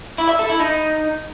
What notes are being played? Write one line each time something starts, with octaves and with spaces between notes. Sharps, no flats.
E4
E5
A4
E4
D#4